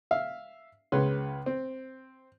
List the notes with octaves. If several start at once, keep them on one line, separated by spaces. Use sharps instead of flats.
E5 F5
C#2 C#3 B4 C#5 C6
C4